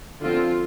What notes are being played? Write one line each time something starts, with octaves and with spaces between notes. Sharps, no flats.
D3 F3 C4 F4